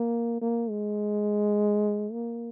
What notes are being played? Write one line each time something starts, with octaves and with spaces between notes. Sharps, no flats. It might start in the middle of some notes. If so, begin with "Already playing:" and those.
Already playing: A#3
A#3
G#3
A#3